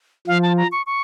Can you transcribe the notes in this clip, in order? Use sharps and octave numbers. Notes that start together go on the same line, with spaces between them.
F3 F5
A5
A#5
C#6
C#6